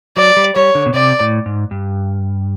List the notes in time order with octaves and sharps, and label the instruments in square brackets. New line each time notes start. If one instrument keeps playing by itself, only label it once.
[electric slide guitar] F#3 [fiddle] D5
[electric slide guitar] G3
[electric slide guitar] G3 [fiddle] C#5
[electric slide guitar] D3
B2
[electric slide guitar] C3 [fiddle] D5
[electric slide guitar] A2
G#2
G2